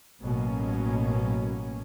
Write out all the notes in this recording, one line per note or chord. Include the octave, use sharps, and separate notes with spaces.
A1 B2 F#3 A#3 C#4